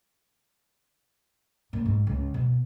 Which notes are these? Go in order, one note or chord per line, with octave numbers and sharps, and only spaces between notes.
A#2
G#2
C#2
B2